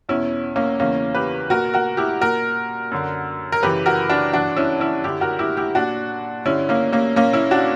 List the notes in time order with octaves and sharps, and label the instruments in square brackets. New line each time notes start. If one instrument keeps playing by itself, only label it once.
[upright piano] E2 B2 C#4 E4
A#3 C#4
E2 C#3 E3 A#3 C#4
G4 B4
A#2 F#4 A#4
F#4 A#4
E4 G4
A#2 F#4 A#4
F#2 D3
A#4
F#2 C#3 E3 G4 B4
F#4 A#4
D4 F#4
G2 E3 D4 F#4
C#4 E4
C#4 E4
F#2 D3 E4 G4
F#4 A#4
E4 G4
E4 G4
A#2 D4 F#4
G2 D3 C#4 E4
A#3 C#4
A#3 C#4
A#2 A#3 C#4
C#4 E4
D4 F#4